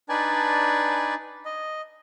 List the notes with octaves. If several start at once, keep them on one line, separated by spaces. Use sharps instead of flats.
D4 D#4 B4 D5 G#5 A5
D#5